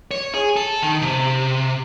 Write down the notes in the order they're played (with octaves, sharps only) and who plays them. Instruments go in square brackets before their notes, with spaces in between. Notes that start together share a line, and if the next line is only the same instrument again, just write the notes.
[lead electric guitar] C#5
G#4
A4
D#3
C3